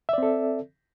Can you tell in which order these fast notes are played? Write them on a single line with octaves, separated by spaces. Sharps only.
E5 D5 C4 A4